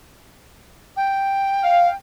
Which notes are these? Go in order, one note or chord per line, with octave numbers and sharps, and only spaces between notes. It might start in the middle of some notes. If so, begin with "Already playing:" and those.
G5
F5